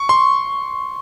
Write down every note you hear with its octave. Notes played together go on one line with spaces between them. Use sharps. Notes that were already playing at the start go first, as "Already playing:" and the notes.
Already playing: C#6
C6